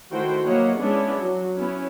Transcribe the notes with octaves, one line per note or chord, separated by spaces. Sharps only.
D#3 A3 E4 F#4 C5 G5
F#3 A#3 E4 C#5 D#5 F#5
G#3 B3 C#4 D4 E4
F#3
B3 C#4 E4